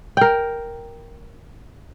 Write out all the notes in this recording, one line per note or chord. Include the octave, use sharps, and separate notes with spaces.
A#4 G5